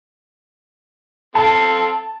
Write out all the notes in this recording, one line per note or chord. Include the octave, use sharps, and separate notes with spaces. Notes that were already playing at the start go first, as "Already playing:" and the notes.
C4 A4 F5 A5